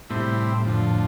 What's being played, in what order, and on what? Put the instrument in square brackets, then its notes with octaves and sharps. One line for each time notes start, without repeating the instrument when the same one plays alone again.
[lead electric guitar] A2 [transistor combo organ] C3 G3 C4 E4
[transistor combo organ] F2 D3 F3